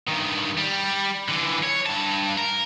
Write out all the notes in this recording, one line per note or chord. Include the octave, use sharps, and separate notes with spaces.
G2 D#3
G3
D3 E3
C#5
G2 A5
A#4